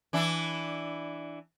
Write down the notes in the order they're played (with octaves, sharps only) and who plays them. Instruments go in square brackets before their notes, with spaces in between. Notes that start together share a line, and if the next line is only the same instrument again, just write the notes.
[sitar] E3 D4 E4